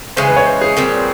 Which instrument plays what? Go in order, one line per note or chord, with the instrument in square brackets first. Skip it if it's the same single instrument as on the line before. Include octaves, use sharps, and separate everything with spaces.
[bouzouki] C#3 E3 G#3 C#4 [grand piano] C5
[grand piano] B4
C#5
C5
G#4
[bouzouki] A#2 G3 C4